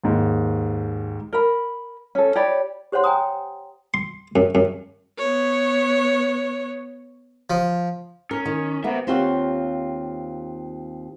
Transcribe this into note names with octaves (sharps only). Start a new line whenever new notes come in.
D#2 G#2
A#4 B5
C#4 A4
G4 C#5 D5 B5
G4 C5 C#5 F#5 C6
G5 G#5 A#5 D#6
C6
F#2
F#2
B3 C#5
F3
C#4 A#4
D#3
A#3 B3 C5 E5
D#2 C4 F4 G4 C#5 F#5